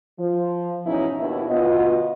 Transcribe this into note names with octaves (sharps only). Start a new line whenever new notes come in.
F3
G#2 B2 E3 C#4 D#4 E4
D#2 B2 D4 E4
D2 B2 B3 F4 D#5